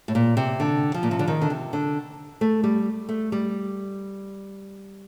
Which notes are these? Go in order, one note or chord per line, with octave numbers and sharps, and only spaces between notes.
A2
A#2
C3
D3
F3
A#2
C3
D3
D#3
D3
C3
D3
A3
G3
A3
G3